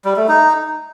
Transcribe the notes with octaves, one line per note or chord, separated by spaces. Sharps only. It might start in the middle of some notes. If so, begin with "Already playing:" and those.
G3
A3
D#4